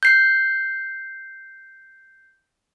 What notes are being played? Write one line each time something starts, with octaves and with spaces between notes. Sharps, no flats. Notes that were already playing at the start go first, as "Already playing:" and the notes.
G6 C7